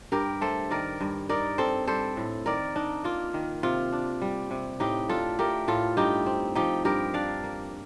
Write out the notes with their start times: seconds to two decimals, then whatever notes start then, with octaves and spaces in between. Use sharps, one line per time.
0.12 G2 G4 A#4
0.41 A3 A4 C5
0.70 D#3 A#4 D5
1.01 G2
1.29 D#4 A#4 D5
1.58 C4 A4 C5
1.87 G3 A4 C5
2.17 A2
2.46 D#3 A#4 D5
2.76 D4 D#4
3.04 A#3 F4
3.34 D#3
3.63 C3 F4
3.92 D4
4.22 G3
4.51 C3
4.80 A2 D#4 G4
5.09 D4 F4 A4
5.39 A3 G4 A#4
5.68 A2 F4 A4
5.97 G2 D#4 G4
6.26 C4
6.55 F3 D#4 G4
6.85 G2 G4 A#4
7.14 D4 D5 F5
7.44 A#3